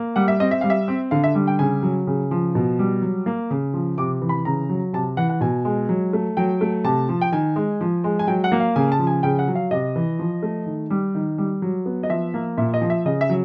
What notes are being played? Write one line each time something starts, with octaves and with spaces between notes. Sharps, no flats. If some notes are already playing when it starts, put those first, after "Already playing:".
Already playing: A#3
G3 F#5
E5
C4 D#5
E5
G3 F5
E5
C4
D3 F5
E5
G3
G5
C#3 G#5
F#3
C#3
F3
B2
G3
F#3
A#3
C#3
F3
C3 D6
E3
B5
C#3 A#5
F#3
C3 A5
E3 F#5
F#5
B2 G#5
G#3
F#3
A3
F#3 G5
A3
C3 A5
F3
G5
D#3 G#5
G#3
F3
G#3
G#5
F#3 G5
F#5
A#3
F5
C#3 G#5
A5
F3
G#5
C#3 G5
F#5
F#3
F5
C3 D#5
E3
F3
A3
D#3
G3
D#3
G3
F#3
B3
D#5
F3 E5
A#3
A#2 E5
D#5
F3
E5
C#3 D#5
E5
F#3